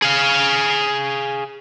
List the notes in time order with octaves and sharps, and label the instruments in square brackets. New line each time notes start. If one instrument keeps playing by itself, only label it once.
[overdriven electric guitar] G#4 F5